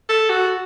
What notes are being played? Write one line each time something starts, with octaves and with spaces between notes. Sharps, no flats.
A4
F#4